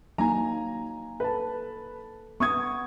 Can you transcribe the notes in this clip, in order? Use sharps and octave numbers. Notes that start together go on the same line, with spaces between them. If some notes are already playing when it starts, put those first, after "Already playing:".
F#3 A#3 D#4 G#5 A#5
A4 B4 A5
B3 C#6 D#6 G#6